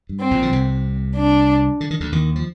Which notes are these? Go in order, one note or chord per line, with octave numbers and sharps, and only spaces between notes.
G2
C4
A#1 A#2
D3
C2 C3
D4
D3
D#3
D2 D3
D#2 D#3
F3